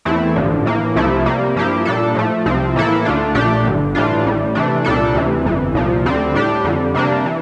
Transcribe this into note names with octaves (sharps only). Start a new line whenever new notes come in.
E2 E3 A3 C4 E4
A1 G2 D3 F3
A2 E3 A#3
C2 C3 F3 A3 E4
C3 G3 A#3
G2 F3 A#3 E4 G4
A#2 G3 D4 A4
A2 F3 A3
C2 C3 F3 C4
A2 E3 A#3 E4 A4
D2 D3 A3 D4 F4
A#1 A#2 A3 D4 G4
G1 G2 D3
A2 E3 G3 D4 F4
A1 A2 G3
C3 E3 A3 D4
C2 A#2 G3 D4 A4
D2 C3 E3
G1 F2 E3
C2 A#2 F3
D2 D3 G3 C4
A2 G3 D4 G4
F2 D3 G3
C3 G3 A#3 D4
E3